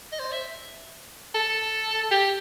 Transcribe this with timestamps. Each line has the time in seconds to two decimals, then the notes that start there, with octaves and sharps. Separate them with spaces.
0.12 D#5
0.20 C5
0.32 E5
1.35 A4
2.11 G4